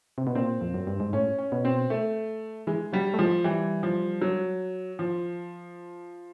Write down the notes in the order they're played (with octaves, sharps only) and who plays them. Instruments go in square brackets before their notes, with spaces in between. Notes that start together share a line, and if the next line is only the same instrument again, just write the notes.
[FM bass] C3
B2
[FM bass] A#2 [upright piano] C4
[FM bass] F2
F#2
G2
G#2
[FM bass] A2 [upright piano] C#4
[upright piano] C#4
[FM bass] B2
[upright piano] C4
A3
[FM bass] E3 [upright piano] G#3
[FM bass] F#3 [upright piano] G3
[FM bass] A3
[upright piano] F3 [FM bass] G#3
[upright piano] E3 [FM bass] G3
[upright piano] F3
F#3
F3